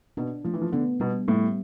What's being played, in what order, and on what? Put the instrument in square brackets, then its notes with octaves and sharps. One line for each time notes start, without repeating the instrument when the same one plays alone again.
[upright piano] B2 [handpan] D4
[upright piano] F3 [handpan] A3
[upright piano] E3
F3
[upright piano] D3 [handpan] B3
[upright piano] B2 [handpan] G3
[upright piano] A2 [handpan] G3